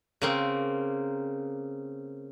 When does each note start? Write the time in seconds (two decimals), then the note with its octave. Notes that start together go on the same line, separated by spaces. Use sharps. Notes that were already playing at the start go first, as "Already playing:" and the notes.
0.21 C#3 A#3 C4